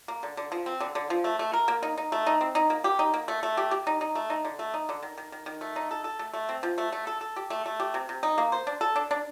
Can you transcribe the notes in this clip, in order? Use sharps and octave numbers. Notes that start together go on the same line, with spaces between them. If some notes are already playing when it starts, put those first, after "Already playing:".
A#3
D3
D3
F3
C4
D3
D3
F3
A3
A3
A#4
A#3
D#4
D#4
A3
D#4
C4
D#4
A#3
G4
D#4
A#3
A3
A3
G4
G4
D#4
D#4
A3
D#4
D3
A3
D#4
D3
D#3
D#3
D#3
D#3
A3
D#4
A4
A4
A3
A3
C4
F3
A3
A3
A4
A4
G4
A3
A3
G4
C3
C3
D#4
A#3
C5
D4
A4
D4
D4